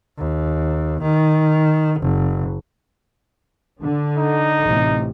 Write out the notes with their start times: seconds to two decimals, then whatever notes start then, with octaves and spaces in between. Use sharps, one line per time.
0.18 D#2
1.02 D#3
2.00 F#1
3.81 D3
4.17 D#4
4.66 A1 A2 C3